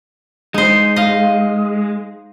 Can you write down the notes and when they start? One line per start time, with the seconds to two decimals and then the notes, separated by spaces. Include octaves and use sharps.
0.54 G#3 D#4 C5
0.96 D#5 F5